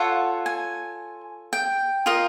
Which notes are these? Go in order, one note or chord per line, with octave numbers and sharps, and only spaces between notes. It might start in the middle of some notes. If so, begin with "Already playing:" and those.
Already playing: F4 A4 C#5 F#5
G#5
G5
F4 A#4 D#5